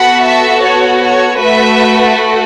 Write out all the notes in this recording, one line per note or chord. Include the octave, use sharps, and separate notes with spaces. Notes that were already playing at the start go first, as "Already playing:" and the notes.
Already playing: B3 F#4 A4 F#5 B5
E5 A5
C#5
C#5
A3 F#4 A4 B4 E5